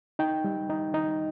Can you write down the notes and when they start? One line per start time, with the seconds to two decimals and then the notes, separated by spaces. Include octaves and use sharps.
0.19 D#4 G5
0.44 G3
0.70 D#4
0.94 D#4